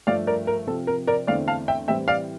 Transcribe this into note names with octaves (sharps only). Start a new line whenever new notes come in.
G2 F3 A3 D5 F5
A#4 D5
A#4
C3 F3 C4 A4
A#4
A#4 D5
E2 D3 A3 C4 D5 F5
F5 A5
E5 G5
A2 E3 G3 C4 E5 G5
D5 F5